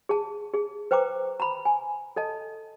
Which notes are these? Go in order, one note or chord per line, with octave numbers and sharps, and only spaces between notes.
G#4 A5
G#4
B4 C5 G5 A#5 D6
A#5 B5
G#5
A4 D#5 A5